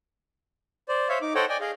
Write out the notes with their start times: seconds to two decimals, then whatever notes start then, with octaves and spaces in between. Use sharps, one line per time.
0.88 C5 D5
1.09 C5 C#5 E5 F5
1.22 D#4 D6
1.35 A4 C5 C#5 D#5 F#5 G5
1.49 D5 D#5 G5 G#5
1.61 G#4 D#5 F5